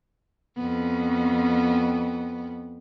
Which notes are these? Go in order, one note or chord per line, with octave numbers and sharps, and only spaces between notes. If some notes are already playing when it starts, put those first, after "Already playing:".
F2 B3